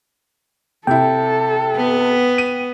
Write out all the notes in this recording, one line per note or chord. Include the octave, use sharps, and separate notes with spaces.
C3 E4 A4 G5
B3
D#7